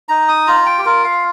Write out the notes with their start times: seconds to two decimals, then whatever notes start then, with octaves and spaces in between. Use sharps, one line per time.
0.09 D#4 A#5
0.28 D#6
0.47 F4 A#5
0.66 G5
0.78 G4
0.85 F4 A#4
1.04 F5